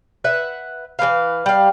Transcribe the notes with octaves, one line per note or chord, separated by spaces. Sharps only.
B4 E5 F#5
E3 A#3 B4 F5
G3 F5